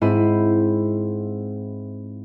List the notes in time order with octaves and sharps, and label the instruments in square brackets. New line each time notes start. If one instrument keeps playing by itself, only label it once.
[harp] G#2 C4 E4 C5 B5 D#7